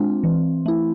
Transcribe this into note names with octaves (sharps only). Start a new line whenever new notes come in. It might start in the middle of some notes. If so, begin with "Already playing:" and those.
Already playing: G#3 C4 D4 F4
E3
A3 E4